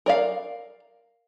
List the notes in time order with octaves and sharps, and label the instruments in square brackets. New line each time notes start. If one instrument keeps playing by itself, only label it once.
[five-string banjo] A#4 D5 F5